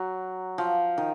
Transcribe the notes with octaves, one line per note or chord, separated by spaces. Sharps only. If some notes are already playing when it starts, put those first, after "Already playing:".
Already playing: F#3
F3
D#3